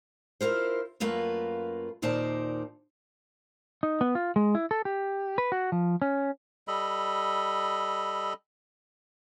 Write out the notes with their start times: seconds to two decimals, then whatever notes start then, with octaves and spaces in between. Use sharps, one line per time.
0.41 E4 F4 A#4 C5
1.00 F#2 A3 A#3 F4 B4
2.02 D#2 A#2 D#4 C5 D5 A5
3.83 D#4
4.01 B3
4.15 F4
4.36 G#3
4.55 E4
4.71 A4
4.85 G4
5.38 B4
5.52 F#4
5.72 F3
6.02 C#4
6.68 G3 A4 D#5 B5